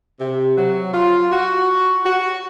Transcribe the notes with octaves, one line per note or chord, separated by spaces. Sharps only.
C3
F#3
F4
F#4
F#4